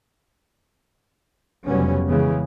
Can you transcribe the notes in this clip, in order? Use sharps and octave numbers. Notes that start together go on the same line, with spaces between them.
F1 C#3 F#3 G3 B3 C#4
C#3 E3 G#3 B3